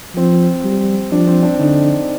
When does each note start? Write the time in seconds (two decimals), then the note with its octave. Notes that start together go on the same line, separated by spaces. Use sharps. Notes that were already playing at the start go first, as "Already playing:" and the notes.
0.16 F3 C4
0.64 G3
1.12 F3 D4
1.27 C4
1.43 D4
1.59 D3 D#4